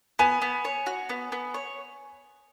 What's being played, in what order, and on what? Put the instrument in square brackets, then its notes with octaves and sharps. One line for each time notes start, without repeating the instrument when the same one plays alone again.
[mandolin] B3 [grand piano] G#5
[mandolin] B3
C#5
F#4
B3
B3
C#5